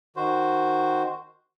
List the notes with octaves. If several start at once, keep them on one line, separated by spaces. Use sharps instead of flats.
D#3 F#4 C5